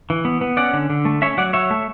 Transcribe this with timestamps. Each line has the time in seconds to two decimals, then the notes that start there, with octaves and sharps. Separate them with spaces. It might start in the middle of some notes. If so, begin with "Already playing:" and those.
0.10 E3
0.25 B3
0.41 B3
0.57 C#4 D5 F#5
0.73 D3
0.90 D3
1.05 A3
1.22 C#4 C#5 E5
1.37 F#3 D5 F#5
1.53 F#3 C#5 E5
1.71 A3